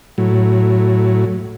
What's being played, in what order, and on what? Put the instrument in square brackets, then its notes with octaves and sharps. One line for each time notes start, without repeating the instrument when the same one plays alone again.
[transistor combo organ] A2 F#3